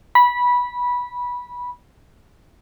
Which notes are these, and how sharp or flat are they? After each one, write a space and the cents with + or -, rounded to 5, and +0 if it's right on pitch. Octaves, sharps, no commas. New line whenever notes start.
B5 -15